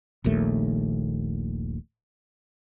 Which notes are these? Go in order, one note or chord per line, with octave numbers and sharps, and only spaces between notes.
D#1 A#1 D#2 A3